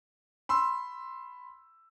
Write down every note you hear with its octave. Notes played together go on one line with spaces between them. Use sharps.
B5 C6 E6